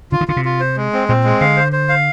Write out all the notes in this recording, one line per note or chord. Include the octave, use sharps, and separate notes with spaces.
D3 F4
D#3
D3 F4
C3
F4
C5
G#3
C4
A#2 C4
G#3
D3 F5
C5
C5
F5